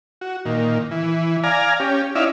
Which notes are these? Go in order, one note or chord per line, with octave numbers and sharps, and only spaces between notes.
F#4
A#2 D#3
E3
D5 F5 G#5 A#5
C#4 G4
C#4 D#4 E4 D5 E5 F5